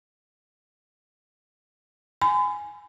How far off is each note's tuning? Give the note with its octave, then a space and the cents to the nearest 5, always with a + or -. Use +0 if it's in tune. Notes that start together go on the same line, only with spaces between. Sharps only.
G#5 +0 B5 +45